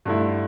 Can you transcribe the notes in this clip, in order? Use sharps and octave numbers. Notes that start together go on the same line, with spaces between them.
G2 D3 A3 E4